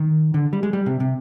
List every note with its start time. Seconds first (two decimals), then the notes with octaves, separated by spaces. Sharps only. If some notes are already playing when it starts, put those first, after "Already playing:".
Already playing: D#3
0.34 D3
0.53 G3
0.63 G#3
0.73 G3
0.86 C3
1.00 C3